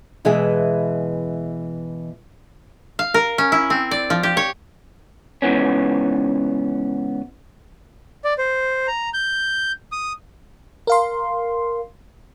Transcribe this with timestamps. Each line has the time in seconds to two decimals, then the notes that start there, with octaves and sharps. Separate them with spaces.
0.25 B2 E3 G#3 B3 G#4 E5
2.99 F5
3.14 A#4
3.38 C#4
3.52 E4
3.70 C4
3.91 D5
4.10 F3
4.23 G4
4.37 C#5
5.42 G#2 C#3 E3 B3 C#4
8.24 D5
8.38 C5
8.87 A#5
9.14 G6
9.92 D#6
10.87 A#4 F5 C6